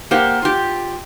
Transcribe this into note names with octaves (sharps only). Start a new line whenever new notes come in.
A#3 G4 C5 F#5
F4 G4